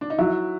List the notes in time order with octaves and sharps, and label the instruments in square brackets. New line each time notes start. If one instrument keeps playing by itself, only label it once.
[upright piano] D4
D#4
[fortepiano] F#3 [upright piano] E4